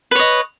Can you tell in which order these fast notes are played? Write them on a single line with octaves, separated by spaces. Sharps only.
B4 C#5 D#5